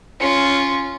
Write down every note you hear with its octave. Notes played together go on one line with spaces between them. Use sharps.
C#4 F4